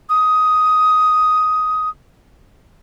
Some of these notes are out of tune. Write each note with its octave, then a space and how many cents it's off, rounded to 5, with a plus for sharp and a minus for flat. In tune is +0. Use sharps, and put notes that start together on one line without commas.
D#6 +10